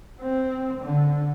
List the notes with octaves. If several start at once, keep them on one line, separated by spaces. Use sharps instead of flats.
C4
D3